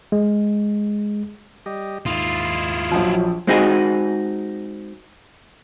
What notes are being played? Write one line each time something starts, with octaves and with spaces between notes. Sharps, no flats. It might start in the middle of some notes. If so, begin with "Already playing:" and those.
G#3
G3 G4 D#5
D#2 G#2 E4 F4 D#6
A#1 F3 F#3
G#3 C4 D#4 F#4 G#4